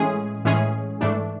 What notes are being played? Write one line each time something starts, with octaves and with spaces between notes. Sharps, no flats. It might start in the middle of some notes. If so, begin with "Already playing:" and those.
Already playing: A2 E3 G#3 C#4 G#4
A2 E3 G#3 C#4 G#4
G#2 E3 A3 D4